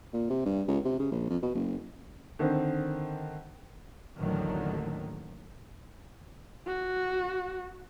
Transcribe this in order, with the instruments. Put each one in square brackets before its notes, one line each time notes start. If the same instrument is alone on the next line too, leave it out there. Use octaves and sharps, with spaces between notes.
[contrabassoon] A#2
C3
G2
C#2
C3
C#3
A#1
F2
B2
F#1
[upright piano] D3 D#3 C4
[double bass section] A1 D#2 A2 D3 D#3 F#3
[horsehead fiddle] F#4